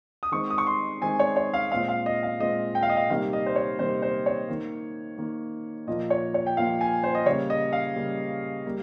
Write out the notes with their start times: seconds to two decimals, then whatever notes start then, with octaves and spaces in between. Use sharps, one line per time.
0.23 D#6
0.32 D#3 G#3 C4 C#6
0.50 D#6
0.58 C#6
0.67 C6
1.01 D#3 G#3 C4 G#5
1.19 C#5
1.36 C#5
1.54 F5
1.71 A#2 G#3 C4 F5
1.88 F5
2.06 D#5
2.23 F5
2.40 A#2 G#3 C4 D#5
2.75 G5
2.83 F5
2.89 D#5
2.97 F5
3.10 C3 D#3 G3 A#3 F5
3.33 D#5
3.46 C5
3.56 C#5
3.79 C3 D#3 G3 A#3 C5
4.02 C5
4.26 C#5
4.48 D#3 A#3
5.18 D#3 A#3
5.87 A#2 F3 A#3 D#5
6.10 C#5
6.34 C#5
6.46 G5
6.57 A#2 F3 A#3 F5
6.81 G#5
7.03 C5
7.15 D#5
7.26 C#3 G3 A#3 C#5
7.50 D#5
7.73 F5
7.96 C#3 G3 A#3
8.65 G3 A#3